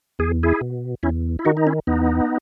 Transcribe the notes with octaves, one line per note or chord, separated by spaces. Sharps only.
E2 G#4
E4 G#4
B2
E2 C#4 E4
E4
D#3 D#4 F#4
D#4
C#4 E4
E2 B3 D#4